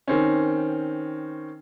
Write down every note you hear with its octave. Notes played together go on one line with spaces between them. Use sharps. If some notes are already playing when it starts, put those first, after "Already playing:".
D#3 C4 C#4